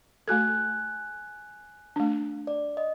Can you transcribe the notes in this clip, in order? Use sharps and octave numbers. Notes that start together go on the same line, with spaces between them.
A3 F#4 A4 G#5 F#6 G#6
A3 D4
D5
D#5